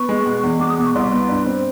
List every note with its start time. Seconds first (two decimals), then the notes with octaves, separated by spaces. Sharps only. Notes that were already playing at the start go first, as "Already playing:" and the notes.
Already playing: B3 C#6
0.09 G#3
0.26 B2
0.43 E2
0.59 G#3 D6
0.69 D#6
0.78 B2 D6
0.86 C#6
0.94 C2 C6
1.12 B3
1.29 G2
1.47 C4